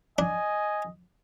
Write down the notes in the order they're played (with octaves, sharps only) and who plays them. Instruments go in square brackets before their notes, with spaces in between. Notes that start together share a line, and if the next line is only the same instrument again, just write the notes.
[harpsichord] D4 [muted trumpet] D#5 [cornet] G#5